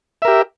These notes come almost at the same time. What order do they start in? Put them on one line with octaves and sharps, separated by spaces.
E5 A#4 G4